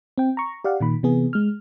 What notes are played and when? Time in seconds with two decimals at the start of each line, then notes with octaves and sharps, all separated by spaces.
0.18 C4 G5
0.37 A#5 C#6
0.64 G4 D5 F5 F#5
0.80 A#2 D#3 B5
1.03 C3 E3 B3 G#4
1.33 G#3 F6